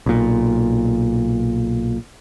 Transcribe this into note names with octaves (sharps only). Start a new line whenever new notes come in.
B1 A#2